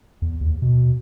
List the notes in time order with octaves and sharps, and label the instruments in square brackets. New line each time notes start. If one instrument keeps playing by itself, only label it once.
[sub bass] E2
D#2
B2